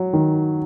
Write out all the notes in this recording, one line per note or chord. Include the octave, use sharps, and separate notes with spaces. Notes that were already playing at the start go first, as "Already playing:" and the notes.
Already playing: F#3
D#3